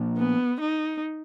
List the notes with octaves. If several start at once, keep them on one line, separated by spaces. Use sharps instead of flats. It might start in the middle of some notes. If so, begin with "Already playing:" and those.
Already playing: A#2 F3 A#3 D4
B3
D#4